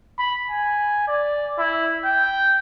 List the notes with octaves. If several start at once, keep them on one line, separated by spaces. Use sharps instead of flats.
B5
G#5
D5
E4
G5